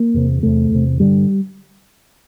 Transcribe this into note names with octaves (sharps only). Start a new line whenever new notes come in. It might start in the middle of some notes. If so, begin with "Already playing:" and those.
Already playing: A#3
E2 C3
E2 C3 A3
E2 C3
G2 D3 G3